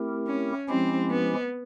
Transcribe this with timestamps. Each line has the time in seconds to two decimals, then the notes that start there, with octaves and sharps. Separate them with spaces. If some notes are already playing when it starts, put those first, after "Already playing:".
Already playing: A3 C4 E4 G4 A#4
0.27 C#4
0.69 F3 G#3 C4 C#4 E4 G4
1.10 B3